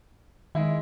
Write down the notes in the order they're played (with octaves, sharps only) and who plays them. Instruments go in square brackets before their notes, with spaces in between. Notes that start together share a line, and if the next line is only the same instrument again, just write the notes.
[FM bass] D#3 [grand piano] G#3 E4